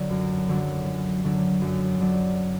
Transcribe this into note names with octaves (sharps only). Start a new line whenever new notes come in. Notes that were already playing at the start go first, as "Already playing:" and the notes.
Already playing: D3 F#3 D4
F#2
D3 F#3 D4
F#2
D3 F#3 D4
F#2
D3 F#3 D4